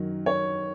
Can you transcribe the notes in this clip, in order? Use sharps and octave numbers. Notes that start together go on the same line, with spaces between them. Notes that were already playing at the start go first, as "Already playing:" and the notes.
Already playing: F#2 D#3 F#3
C#5